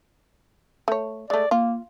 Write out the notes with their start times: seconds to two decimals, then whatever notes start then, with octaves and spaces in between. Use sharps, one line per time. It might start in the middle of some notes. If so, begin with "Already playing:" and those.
0.88 A3 C#5
1.30 G#3 A3 D5
1.51 A#3 F4